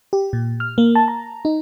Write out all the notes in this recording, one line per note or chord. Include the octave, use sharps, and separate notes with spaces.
G4
A#2
F6
A#3
A5
A#5
D#4